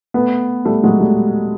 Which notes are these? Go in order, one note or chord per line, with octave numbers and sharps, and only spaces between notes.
A3 B3
G3 A3
F#3 G#3
G3 A3